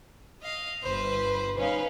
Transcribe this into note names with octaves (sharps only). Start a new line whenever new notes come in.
D#5 F5
G1 B4 C5
C#4 D#4 B4 F5